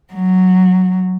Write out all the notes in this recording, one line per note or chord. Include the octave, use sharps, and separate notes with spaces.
F#3